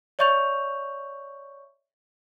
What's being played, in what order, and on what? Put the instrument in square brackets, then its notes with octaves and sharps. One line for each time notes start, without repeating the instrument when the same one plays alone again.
[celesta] C#5 D5 E5 C#6 G6 F7